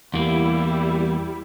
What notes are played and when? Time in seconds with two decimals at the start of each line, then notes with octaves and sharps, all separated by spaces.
0.14 E2 G3 A#3 E4